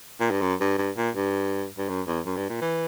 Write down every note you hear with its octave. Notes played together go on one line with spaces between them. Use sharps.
A#2
G2
F#2
G2
G2
A#2
G2
G2
F#2
E2
F#2
G2
A#2
E3